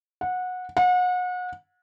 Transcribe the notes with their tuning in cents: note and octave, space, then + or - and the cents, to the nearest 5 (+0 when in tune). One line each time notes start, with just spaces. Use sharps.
F#5 -20
F#5 -35